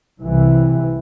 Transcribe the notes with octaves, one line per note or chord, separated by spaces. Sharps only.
C2 C3 E3